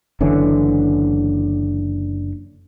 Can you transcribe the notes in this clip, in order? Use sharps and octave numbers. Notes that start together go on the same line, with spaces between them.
F#1 D3 E3 C#4